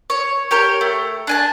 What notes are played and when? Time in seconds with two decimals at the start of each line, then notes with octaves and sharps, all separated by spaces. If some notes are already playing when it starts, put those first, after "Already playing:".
0.10 C#5
0.51 G4 A#4 C#5
0.81 A3
1.27 D4 G#5 A5